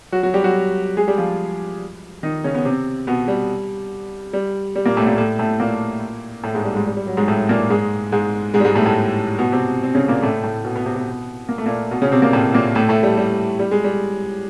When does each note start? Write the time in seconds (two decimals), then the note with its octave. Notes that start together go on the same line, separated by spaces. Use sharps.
0.12 F#3 F#4
0.23 F#3 F#4
0.34 G3 G4
0.44 F#3 F#4
0.97 G#3 G#4
1.07 G3 G4
1.18 F3 F4
2.23 D#3 D#4
2.44 C#3 C#4
2.54 B3
2.65 C3 C4
3.07 B2 B3
3.28 G3
4.33 G3
4.76 G3
4.85 A#2 A#3
4.97 A2 A3
5.07 A#2 A#3
5.17 A2 A3
5.39 A2 A3
5.60 A#2 A#3
6.43 A2 A3
6.54 G#2 G#3
6.65 G3
6.75 G#2 G#3
6.86 G3
6.97 G3
7.07 F#3
7.17 G#2 G#3
7.28 A2 A3
7.49 A#2 A#3
7.70 G#2 G#3
8.12 G#2 G#3
8.54 G#2 G#3
8.60 G3
8.65 G#2 G#3
8.75 A2 A3
8.86 A2 A3
9.38 B2 B3
9.52 C3 C4
9.83 C4
9.94 C#3 C#4
10.08 A#2 A#3
10.23 A2 A3
10.43 A2 A3
10.64 B2 B3
10.75 B2 B3
10.86 C3 C4
10.96 B2 B3
11.49 A#3
11.58 A3
11.66 A#2 A#3
11.91 B2 B3
12.02 C#3 C#4
12.12 C3 C4
12.22 A#2 A#3
12.33 A2 A3
12.54 A#2 A#3
12.75 A2 A3
12.89 A2 A3
13.03 G3
13.17 G3
13.59 G3
13.71 G#3
13.84 G3